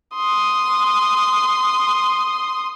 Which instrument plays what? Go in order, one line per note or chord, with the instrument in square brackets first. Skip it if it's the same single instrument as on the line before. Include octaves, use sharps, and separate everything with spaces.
[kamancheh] C6 D#6